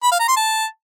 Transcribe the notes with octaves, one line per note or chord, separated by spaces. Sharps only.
B5
F5
A#5
C6
A5